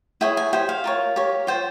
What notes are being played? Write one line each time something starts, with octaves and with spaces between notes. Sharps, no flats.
E4 G#4 C#5 G5
G#5
G4 C5 G5
F5
F4 A#4 C#5
G4 C#5
F4 C5 G5